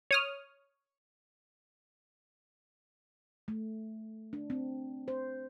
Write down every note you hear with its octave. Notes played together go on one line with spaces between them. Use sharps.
C#5 D#6 F6
A3
D4
C4
C5